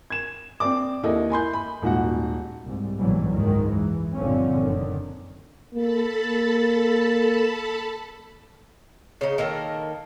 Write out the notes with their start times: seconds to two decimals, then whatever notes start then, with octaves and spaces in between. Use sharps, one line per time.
0.10 G#6 E7
0.60 C4 D5 D6
1.03 D#2 E4 A4 D#5
1.30 G#5 B5 C6 G6
1.53 B5
1.82 D#1 G#2 F#4 F#5
2.65 C2 G#2
2.98 A#1 G#2 B2 E3 F#3 G3
3.30 F#1 C#2 G#2 D#3 G#3
3.72 E3
4.16 G1 A#2 D3 F3 C4 C#4
4.59 F#1 D3 D#3
5.74 A#3 A4 A5 B5
6.23 A#3
9.21 C#3 D#4
9.38 D#3 A#3 A4 A#4